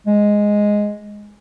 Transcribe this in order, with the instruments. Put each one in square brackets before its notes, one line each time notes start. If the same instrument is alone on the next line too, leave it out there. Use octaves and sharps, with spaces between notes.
[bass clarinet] G#3